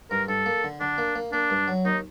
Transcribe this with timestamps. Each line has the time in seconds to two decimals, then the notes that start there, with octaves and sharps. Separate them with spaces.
0.11 G2 A#4
0.28 G2 A4
0.46 A#3
0.64 D3
0.80 D3 D4
0.98 A#3
1.15 A#3
1.32 A#3 D4
1.50 G2
1.68 F#3
1.85 D#2 D#4